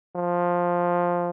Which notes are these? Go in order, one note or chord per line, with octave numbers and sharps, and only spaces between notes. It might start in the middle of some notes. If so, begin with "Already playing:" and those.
F3